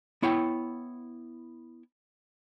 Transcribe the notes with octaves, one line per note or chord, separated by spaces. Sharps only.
B3 E4 C#5 F#5 G5